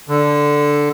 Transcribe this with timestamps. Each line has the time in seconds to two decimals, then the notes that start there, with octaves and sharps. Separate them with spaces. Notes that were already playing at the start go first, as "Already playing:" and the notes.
0.09 D3